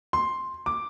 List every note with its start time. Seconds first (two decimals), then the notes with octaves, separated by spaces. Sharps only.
0.13 C6
0.66 D6